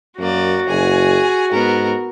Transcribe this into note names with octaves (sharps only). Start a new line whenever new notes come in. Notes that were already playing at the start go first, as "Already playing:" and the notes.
F#2 A#3 F#4 D5
F#1 G#4 G#5
G#2 B3 A#4